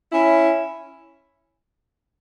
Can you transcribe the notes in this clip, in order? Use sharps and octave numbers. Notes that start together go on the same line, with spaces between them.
C#4 E4